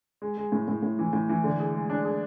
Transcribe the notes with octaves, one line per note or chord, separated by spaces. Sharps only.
G#3
G#3
A2
A2
A2
E3
A2
E3
D3
G#4
G#3
D4
G#4